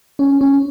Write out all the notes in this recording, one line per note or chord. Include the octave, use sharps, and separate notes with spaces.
C#4
C#4